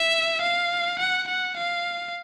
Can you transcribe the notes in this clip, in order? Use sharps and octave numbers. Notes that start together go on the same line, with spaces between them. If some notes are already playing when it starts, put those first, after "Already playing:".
Already playing: E5
F5
F#5
F#5
F5